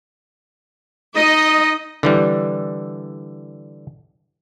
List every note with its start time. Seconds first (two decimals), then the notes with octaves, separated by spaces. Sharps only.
1.16 D#4 D#5
2.03 D3 E3 G3